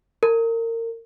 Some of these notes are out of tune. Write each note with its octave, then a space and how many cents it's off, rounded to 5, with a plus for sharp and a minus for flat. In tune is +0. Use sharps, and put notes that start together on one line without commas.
A#4 -30